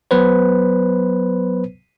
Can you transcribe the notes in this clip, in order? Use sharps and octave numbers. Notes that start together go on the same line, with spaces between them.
F#3 B3 B4 C5